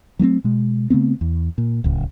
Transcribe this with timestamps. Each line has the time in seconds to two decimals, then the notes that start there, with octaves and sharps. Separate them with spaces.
0.19 F#3 A3 A#3 C4
0.44 B2 G#3
0.90 C#3 A3 B3 C4
1.21 E2
1.58 A#2
1.84 D1 C#2